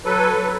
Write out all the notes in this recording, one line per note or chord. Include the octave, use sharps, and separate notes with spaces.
F#3 A4 B4
F#3